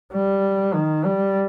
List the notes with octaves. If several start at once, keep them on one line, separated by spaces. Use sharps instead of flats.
G3
D#3
G3